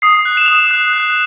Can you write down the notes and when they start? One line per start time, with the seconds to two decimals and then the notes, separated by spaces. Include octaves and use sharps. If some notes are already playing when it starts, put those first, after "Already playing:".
0.02 D#6 C7
0.25 F#6
0.37 E7
0.46 D#6 F7
0.55 E7
0.71 F#6
0.93 F#6